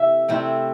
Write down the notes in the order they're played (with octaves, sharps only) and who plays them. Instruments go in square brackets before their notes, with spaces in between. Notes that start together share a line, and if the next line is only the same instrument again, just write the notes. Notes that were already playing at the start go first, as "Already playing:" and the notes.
Already playing: [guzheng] C3 E4 A4 E5
C3 A3 C4 E4